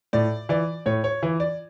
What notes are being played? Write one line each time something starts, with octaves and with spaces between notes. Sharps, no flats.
A2 D5
E3 D5
A2 C#5
C#5
E3
D5